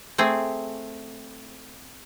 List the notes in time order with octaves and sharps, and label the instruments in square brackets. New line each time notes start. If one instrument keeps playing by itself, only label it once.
[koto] A3 C4 G#4